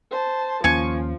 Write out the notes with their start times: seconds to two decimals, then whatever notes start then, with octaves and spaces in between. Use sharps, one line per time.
0.11 C5 A5
0.64 D#2 F3 A#3 C#4 G#5 C#6